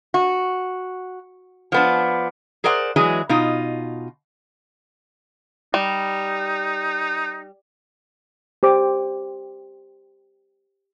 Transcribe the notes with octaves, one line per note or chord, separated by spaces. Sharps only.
F#4
F3 B3 D4
G#4 A#4 C5 D5 F#5
E3 F#3 G#3 G#4
B2 D#4 F4
G3 D#4
G4 C5 D6